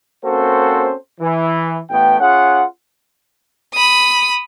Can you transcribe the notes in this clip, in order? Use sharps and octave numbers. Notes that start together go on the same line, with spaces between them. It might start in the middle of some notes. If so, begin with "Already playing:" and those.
A#3 C4 C#4 F#4 A4 C5
E3
A1 A3 B3 G5
C#4 F4 G#4 F#5
B5 D#6